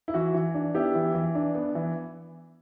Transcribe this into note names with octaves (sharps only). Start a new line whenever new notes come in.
E4
E3 F#4
E3
D4
B3 E4 G4
E3
E3
D4
B3
E3